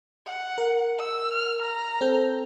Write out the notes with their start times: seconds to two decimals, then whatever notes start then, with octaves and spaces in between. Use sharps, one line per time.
0.26 F#5
0.58 A#4
0.99 E6
1.33 F6
1.62 A#5
2.01 C4 A4 G6